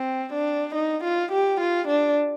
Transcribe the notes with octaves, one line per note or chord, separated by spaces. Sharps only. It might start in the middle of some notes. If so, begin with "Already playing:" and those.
Already playing: C4
D4
D#4
F4
G4
F4
D4